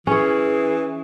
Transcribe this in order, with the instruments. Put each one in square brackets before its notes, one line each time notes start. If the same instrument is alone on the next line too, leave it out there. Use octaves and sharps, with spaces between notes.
[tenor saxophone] E3 [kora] C#4 C#5 [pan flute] G#4